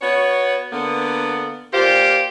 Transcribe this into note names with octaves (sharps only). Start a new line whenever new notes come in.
B3 F#4 C#5
D3 A#3 B3
A#2 F4 G4 C5